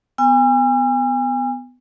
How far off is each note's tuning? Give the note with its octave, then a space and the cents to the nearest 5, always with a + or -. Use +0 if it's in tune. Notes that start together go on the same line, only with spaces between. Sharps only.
B3 +20 G#5 -35 E6 +45